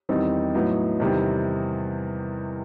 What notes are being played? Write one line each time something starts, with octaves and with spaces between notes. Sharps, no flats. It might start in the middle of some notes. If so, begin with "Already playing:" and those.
E2 D#3 G3 C4 D#4
A2 F#3 B3 D#4
E2 C3 D#3 G3